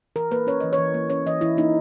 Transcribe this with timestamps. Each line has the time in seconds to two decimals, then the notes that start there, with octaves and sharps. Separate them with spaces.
0.16 E3 A#4
0.31 A#3 B4
0.47 C#4 C#5
0.60 E3 D#5
0.73 C#5
0.78 E3
0.94 A#3
1.10 C#4 C#5
1.26 E3 D#5
1.41 E3 E4
1.57 A#3 D#4